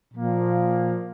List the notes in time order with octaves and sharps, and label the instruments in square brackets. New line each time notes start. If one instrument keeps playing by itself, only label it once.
[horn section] A#2 F3 A#3